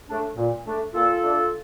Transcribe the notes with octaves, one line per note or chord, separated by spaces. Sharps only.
A3 D4
A#2
A3 D4
A#2 F4 A4
A3 D4